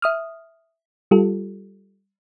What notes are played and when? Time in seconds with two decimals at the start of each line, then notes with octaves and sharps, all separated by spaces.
0.02 E5 D#6 F6
1.11 G3 F4 G4 A4